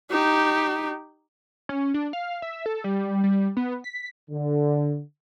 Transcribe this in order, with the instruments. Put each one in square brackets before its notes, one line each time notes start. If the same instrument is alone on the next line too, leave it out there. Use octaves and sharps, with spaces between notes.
[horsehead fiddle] D#4 G4
[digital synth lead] C#4
D4
F5
E5
A4
G3
G3
B3
B6
[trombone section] D3